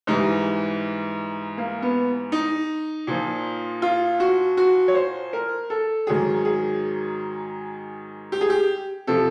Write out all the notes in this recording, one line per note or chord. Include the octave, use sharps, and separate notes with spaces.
G#2 E3 G3 D#4
A#3
B3
D#4
A#2 F3
F4
F#4
F#4
C#5
C5
A#4
A4
G#2 D#3 F#3 G#4
G#4
G4
G#4
G4
C3 F3 A4